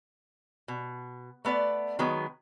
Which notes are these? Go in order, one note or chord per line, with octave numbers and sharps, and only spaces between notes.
B2
A3 B3 B4 D5
D#3 F#3 G#3 B3